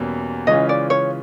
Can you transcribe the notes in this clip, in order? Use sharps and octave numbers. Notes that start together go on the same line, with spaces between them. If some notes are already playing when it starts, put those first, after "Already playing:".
Already playing: E2 B2 G3 A#3 C#4
C#3 E3 G#3 C#4 F4 D#5
D5
C#5